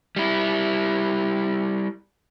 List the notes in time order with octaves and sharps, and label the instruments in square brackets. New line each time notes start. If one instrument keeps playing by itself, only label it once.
[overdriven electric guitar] G3 E4